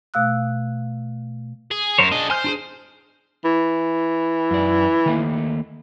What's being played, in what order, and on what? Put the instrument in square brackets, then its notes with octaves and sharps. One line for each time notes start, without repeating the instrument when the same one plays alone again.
[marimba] B2 A3 F5 E6 F#6
[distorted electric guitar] G#4
[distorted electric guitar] F#2 [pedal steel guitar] A#4 C5 C#5
[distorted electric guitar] D4 G#4 [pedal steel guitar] D#5
[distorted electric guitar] C5 [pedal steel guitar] G#5 F6 G6
[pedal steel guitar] D4 F4 G#4
[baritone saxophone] E3
[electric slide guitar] F#2 D5
D#3 A3 A#3